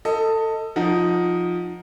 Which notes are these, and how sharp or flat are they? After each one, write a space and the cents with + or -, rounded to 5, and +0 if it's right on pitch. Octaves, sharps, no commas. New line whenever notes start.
A4 +20 D#5 +10
F3 +15 D#4 +0 F#5 +0